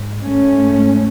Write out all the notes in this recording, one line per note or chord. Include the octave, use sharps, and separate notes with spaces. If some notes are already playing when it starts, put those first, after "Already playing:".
Already playing: G#2
A3 C#4